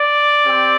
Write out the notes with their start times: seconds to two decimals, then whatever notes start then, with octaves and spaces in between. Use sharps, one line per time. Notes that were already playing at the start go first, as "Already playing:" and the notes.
Already playing: D5
0.45 C4 G4